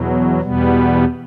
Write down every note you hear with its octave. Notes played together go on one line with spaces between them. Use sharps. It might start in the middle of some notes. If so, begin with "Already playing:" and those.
Already playing: E2 B2 F#3
E2 B2 G3 B3